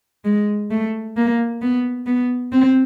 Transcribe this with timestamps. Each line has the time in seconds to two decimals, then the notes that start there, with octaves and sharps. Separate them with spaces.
0.25 G#3
0.71 A3
1.17 A#3
1.62 B3
2.06 B3
2.52 C4